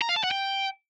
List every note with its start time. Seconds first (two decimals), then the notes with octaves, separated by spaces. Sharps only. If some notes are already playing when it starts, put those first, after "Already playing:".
0.02 A#5
0.09 F5
0.16 A5
0.24 F#5
0.31 G5